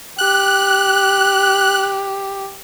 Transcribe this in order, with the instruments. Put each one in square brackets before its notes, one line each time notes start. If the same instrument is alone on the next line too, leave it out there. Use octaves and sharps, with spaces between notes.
[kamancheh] G4 [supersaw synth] F#6